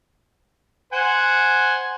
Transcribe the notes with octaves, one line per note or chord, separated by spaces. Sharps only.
C5 F#5 G#5